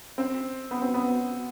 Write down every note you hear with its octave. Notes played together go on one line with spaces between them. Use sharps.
C4
B3
C4
B3